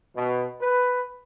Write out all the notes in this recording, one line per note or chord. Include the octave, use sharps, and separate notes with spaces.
B2
B4